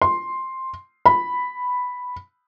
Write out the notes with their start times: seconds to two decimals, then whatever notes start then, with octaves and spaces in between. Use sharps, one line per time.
0.02 C6
1.06 B5